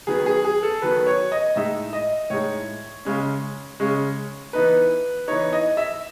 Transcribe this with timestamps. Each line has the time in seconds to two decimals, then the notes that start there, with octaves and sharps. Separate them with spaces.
0.07 D#3 F#3 B3 G#4
0.26 G#4
0.45 G#4
0.63 A4
0.82 D#3 F#3 B3 B4
1.07 C#5
1.32 D#5
1.56 A2 G#3 D#4 E5
1.93 D#5
2.30 A2 G#3 D#4 C#5
3.05 C#3 G#3 C#4
3.80 C#3 G#3 C#4
4.53 E3 B3 D#4 B4
5.28 E3 B3 D#4 C#5
5.53 D#5
5.77 E5